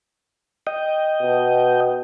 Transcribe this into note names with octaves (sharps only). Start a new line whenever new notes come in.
D#5 G5
B2